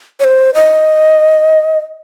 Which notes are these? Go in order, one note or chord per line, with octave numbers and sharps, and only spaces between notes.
C#5
C5
D#5